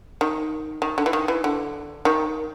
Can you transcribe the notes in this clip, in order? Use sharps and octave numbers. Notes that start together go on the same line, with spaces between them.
D#3
D#3
D3
E3
D#3
E3
D3
D#3